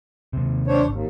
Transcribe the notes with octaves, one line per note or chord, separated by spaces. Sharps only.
D#2 C3
D4 C5 C#5
G#1 D#2